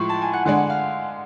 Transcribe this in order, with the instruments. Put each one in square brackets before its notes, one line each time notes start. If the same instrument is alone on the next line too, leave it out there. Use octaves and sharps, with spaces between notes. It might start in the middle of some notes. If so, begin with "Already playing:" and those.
Already playing: [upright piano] A2 F3 G#3 [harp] B5 C#6
[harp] A5
G#5
F#5
[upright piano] D3 G#3 D4 [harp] F#5
[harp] F#5
F5